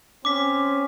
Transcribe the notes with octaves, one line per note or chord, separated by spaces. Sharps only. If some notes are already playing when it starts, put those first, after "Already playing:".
C4 C#4 D6 B6